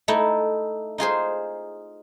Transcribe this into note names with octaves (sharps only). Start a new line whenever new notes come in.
A3 D#4 E4
D#4 F4 G#4 C5